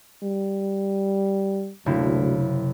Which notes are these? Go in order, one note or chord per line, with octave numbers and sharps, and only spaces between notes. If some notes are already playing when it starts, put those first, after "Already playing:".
G3
F#1 D2 C3 E4